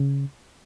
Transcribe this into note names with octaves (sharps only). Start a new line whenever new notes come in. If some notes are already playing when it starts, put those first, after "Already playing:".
Already playing: C#3